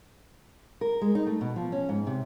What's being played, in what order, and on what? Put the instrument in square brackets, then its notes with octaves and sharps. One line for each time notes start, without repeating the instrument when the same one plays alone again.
[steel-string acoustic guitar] A#4
G#3
D#4
A3
B2
F3
C#4
G#2
C3